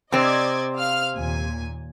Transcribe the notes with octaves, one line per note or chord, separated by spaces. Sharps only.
C3 C4 D5 D#5 G#6
F5 F6
D#2 A#2 G#5